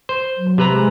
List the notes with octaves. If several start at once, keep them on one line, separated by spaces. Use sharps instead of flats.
C5
F#3
C3 B4 A#5
G#3